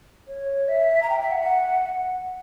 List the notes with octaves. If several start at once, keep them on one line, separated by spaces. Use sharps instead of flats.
C#5
E5
A#5
G5
E5
F#5
F#5